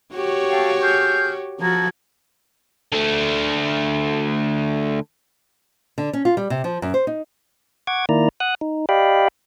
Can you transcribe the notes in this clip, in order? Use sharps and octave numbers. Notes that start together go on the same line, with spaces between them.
F#4 G4 C#5
A4 F5 G5
G#4 F6 G6
F3 F#4 A4 A#4 G#6
D3 A3
D3
C#4
F4
G3
C3
F3
F#2
C5
D#4
F#5 C#6 D6 G#6
D#3 A#3 E4 D5 A#5
F#5 D#6 F#6
D#4
G4 D5 D#5 F5 G5 B5